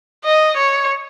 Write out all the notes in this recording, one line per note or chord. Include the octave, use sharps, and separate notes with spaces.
D#5
C#5